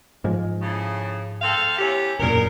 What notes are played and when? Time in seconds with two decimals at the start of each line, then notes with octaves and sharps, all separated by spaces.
0.24 G#2 F3 G#3
0.60 A2 C#3
1.42 C4 A4 F5
1.79 E2 C#4 G4
2.19 E1 F#2 A#2 C#3 A#4